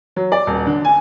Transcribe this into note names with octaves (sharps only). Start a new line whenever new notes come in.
F#3
D5
D#1
D3
G#5